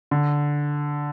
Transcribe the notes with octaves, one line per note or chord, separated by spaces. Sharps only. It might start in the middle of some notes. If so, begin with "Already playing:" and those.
D3